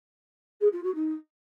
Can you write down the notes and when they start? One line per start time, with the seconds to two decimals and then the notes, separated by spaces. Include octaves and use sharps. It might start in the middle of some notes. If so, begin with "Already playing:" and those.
0.61 G#4
0.72 F4
0.83 F#4
0.94 D#4